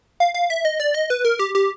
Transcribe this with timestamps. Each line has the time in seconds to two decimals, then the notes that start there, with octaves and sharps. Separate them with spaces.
0.20 F5
0.34 F5
0.50 E5
0.65 D#5
0.80 D5
0.94 D#5
1.10 B4
1.25 A#4
1.39 G4
1.55 G4